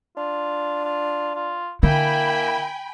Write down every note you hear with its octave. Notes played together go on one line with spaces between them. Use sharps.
D4 F4
F4
F4
D3 A#3 E4 G5 G#5 B5